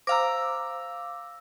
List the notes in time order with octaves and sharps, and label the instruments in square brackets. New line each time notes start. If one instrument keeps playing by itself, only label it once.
[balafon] C5 G5 A#5 [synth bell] F5 D6 [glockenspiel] E6 A#6